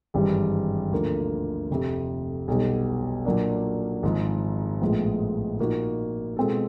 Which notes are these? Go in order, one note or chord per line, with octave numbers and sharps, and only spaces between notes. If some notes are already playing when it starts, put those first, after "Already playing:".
G#1 G2 E3 G3
D2 D3 F3 A#3
F1 F2 C3
B1 B2 G3
A#2 F#3 A#3 D4
G#1 G#2 F3
A#1 A2 F3 G#3 B3
A#2 F3 A#3 D#4 F#4
B2 G#3 C4 F4 A4